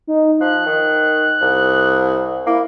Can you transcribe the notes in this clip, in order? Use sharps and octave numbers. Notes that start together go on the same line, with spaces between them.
D#4
F3 F#6
D#3
C2
A#3 E4